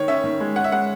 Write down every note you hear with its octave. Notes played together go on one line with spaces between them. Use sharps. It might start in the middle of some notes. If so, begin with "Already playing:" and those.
Already playing: D#3 C#5
C#4 E5
D#3
G#3
C#4 F#5
E5
G#3 F#5